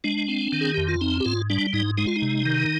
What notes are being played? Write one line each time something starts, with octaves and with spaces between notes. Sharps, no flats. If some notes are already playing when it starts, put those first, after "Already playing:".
G#3 D4
C4
D#3
G#4
F2 G4
F4
C4 D#4
G4
G#2 F4
G3 D4
G#2 D#4
G#3 D#4
F4
D#4
C3
D#3